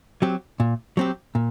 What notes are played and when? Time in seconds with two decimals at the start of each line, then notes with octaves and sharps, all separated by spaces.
0.22 F#3 C4 G4
0.60 A#2
0.97 F#3 C4 G4
1.35 A#2